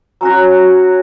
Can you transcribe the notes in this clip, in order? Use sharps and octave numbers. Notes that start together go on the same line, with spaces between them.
F#3 C#4 F#4